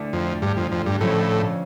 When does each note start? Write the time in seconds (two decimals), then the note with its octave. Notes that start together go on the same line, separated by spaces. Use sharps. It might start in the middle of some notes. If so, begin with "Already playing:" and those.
Already playing: D2 D3 A3 E4
0.13 F2
0.42 G2
0.57 F2
0.72 F2
0.86 G2
1.01 F2 A2 D3 F3 C#4